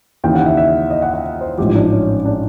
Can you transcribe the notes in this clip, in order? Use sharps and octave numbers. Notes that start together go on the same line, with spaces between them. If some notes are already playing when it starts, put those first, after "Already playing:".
D#2 C#3 E3 G5
F#5
E5
E5
D#5
F#5
F#5
C5
A1 G#2 F3 G4
D4
C#4
D4